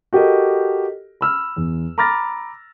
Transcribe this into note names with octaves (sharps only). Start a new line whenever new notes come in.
F#4 G4 A4 A#4 D#5
B5 E6 F6
E2
A#5 B5 D6 F6 A6 A#6